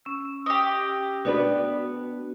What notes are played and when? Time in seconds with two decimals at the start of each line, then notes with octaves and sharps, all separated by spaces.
0.05 C#4 E6
0.46 G4 D#5
1.25 B3 D4 F#4 B4